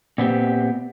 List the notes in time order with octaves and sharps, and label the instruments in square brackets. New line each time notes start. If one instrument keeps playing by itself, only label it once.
[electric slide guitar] A#2 B3 C4 G4